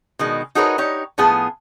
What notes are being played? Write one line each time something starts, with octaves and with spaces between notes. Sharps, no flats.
B2 D#3 G#3
D#4 F#4 G#4 A#4 B4 C#5
D#4 G4 C#5
A2 F3 B3 F4 G#4